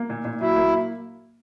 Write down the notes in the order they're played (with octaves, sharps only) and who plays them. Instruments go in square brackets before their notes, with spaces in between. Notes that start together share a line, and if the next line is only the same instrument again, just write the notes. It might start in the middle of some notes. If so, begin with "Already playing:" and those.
Already playing: [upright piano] A#3
A#2
A#2
[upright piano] F#3 [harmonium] E4
[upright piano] A#3